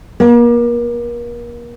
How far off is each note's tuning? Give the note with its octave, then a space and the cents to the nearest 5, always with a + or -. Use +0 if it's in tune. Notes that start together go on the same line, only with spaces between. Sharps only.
A#3 +35